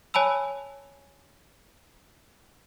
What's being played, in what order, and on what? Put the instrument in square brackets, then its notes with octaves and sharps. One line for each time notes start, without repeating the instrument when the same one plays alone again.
[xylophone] C#5 G#5 A5 B5 E6